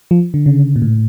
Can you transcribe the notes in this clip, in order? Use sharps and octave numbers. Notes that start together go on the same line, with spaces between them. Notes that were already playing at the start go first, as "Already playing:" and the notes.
F3
D3
C#3
A#2
A2